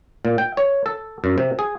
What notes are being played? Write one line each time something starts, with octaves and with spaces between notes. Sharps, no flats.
A#2
G5
C#5
A4
F#2
C3
G#4